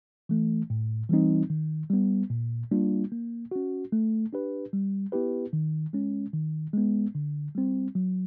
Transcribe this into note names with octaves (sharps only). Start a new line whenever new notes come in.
E3 A3
A2
E3 G3 C4 D#4
D#3
G3 B3
A#2
G3 A#3 D4 F4
A#3
C#4 F#4
A3
D4 G4 B4
G3
B3 E4 G4 B4
D#3
G#3 C#4
D#3
G#3 B3
D3
G3 C4
F#3